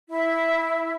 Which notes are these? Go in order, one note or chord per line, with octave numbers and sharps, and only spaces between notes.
E4 E5